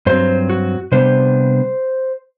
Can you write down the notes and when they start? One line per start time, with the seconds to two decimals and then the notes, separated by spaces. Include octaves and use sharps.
0.06 G2 F#3 C4 C5
0.49 F#4
0.92 C3 G3 B3 D4 C5